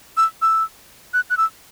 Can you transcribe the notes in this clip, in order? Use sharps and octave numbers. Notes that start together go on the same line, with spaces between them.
E6
E6
F#6
F#6
E6